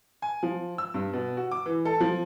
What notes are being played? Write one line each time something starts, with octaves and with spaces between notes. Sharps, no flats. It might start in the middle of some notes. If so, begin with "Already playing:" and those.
G#5
F3
E6
G2
B2
F#4
D6
E3
A4
F3